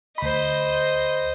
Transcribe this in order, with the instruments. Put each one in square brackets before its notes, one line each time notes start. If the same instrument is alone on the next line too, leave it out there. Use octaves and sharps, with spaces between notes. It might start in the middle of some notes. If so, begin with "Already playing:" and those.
[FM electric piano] D2 B5 [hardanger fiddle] C5 D#5